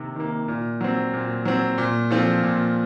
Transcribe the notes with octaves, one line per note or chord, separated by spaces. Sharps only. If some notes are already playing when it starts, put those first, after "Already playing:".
Already playing: C3 D#3 A#3
D#3 A#3
A#2
F#3 C4
A#2
F#3 C4
A#2
F3 C4 F4 A4
A#2